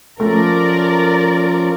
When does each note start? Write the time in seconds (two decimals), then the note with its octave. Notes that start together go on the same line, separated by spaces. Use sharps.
0.20 F3 A3 C#4 F4 A#4 D5